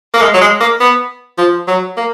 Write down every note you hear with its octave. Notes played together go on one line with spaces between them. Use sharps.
A#3
G#3
F#3
G#3
A#3
B3
F3
F#3
A#3